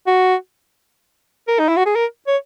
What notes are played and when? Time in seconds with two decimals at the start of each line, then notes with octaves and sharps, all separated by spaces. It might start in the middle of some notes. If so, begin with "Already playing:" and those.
0.07 F#4
1.48 A#4
1.59 D#4
1.69 E4
1.77 F#4
1.86 G#4
1.96 A#4
2.27 C#5